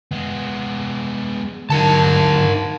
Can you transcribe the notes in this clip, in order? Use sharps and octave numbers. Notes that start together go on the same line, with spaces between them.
G#3 B3
D3 F#3 D#4 A#4 A5